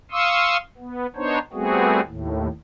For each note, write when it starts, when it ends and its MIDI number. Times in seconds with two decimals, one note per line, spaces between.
0.12 0.57 77
0.12 0.57 84
0.12 0.57 85
0.12 0.57 87
0.12 0.57 88
0.78 1.06 59
1.16 1.38 59
1.16 1.38 62
1.16 1.38 63
1.16 1.38 72
1.16 1.38 73
1.53 2.00 55
1.53 2.00 57
1.53 2.00 59
1.53 2.00 60
1.53 2.00 66
1.53 2.00 68
2.06 2.48 39
2.06 2.48 45